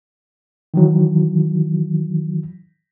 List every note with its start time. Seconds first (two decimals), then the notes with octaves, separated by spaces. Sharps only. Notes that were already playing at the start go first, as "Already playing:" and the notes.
0.74 D#3 E3 F#3